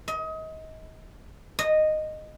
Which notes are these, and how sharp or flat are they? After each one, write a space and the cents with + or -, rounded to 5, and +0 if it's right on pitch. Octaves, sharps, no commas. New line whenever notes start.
D#5 +30
D#5 -10